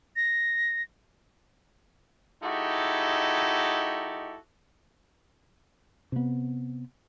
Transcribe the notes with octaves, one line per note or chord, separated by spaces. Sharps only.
A#6
G#3 D#4 E4 F#4 G4 A4
C3 B3